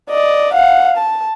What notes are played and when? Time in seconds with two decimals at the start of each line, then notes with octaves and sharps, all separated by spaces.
0.10 D5 D#5
0.53 F5 F#5
0.97 A5